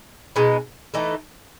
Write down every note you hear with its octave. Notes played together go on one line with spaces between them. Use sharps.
B2 G#3 D#4
E3 A3 D#4 A4